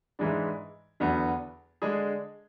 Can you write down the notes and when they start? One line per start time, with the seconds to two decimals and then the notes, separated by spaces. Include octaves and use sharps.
0.19 G#2 E3 G#3 D4
1.00 E2 D3 F#3 B3
1.82 D3 G#3 D4 G#4